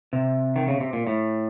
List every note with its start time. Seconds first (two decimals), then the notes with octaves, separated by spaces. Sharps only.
0.13 C3
0.56 D#3
0.68 C#3
0.81 C3
0.93 A#2
1.07 A2